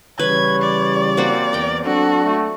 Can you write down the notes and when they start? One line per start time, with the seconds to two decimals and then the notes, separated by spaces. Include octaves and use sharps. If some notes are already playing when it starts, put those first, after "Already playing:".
0.19 C#3 E3 G3 B4 C#5 G#6
0.62 D5
1.17 A#3 C4 F#4
1.53 E2 E3 A#4 G5
1.85 F#3 C4 D4 F#4 A4
2.25 A3